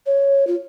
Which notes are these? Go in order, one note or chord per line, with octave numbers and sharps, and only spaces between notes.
C#5
F4